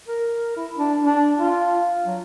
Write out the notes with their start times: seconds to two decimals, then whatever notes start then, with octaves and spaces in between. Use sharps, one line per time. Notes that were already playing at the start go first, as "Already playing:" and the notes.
0.08 A#4
0.56 E4
0.78 D4
1.02 D4
1.38 F4
2.05 F#3